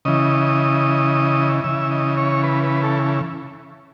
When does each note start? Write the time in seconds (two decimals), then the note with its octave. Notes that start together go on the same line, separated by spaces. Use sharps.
0.05 C#3 E3 D#5
1.64 C#3 E3 E5
1.91 D#5
2.17 C#5
2.43 B4
2.64 B4
2.83 A4